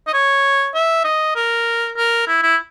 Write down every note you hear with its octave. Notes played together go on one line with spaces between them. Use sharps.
D#5
C#5
E5
D#5
A#4
A#4
E4
E4